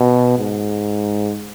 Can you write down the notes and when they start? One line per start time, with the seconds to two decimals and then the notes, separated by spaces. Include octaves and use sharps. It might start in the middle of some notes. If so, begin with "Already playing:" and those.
Already playing: B2
0.38 G#2